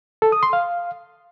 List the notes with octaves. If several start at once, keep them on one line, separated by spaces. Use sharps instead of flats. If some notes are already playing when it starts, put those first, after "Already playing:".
A4
D#6
C6
F5